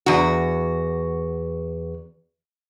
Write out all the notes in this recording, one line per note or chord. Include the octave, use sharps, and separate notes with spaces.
E2 F#4